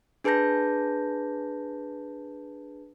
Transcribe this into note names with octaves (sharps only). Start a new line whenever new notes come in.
D4 G#4 B4 A5 G6 A#6